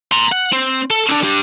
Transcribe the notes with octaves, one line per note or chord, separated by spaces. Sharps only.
A#5 C6
F#5
C4
A4
D3 D4
D4 G4